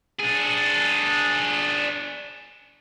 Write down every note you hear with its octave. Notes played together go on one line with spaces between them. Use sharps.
D4 G#4